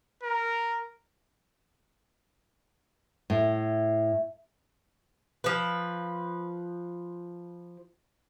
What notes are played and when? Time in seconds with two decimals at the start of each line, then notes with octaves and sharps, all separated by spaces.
0.23 A#4
3.30 A2
5.44 F3 B4